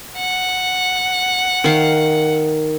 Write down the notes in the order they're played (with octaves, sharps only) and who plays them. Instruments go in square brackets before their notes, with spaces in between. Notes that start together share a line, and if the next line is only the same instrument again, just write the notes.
[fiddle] F#5
[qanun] D#3 F5